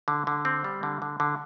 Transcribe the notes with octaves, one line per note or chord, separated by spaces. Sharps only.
D3
D3
C4
G3
D3
D3
D3